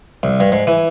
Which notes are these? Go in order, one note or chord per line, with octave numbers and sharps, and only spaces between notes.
C2
G2
G#2
E3